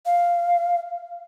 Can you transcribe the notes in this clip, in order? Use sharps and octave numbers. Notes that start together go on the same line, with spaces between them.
F5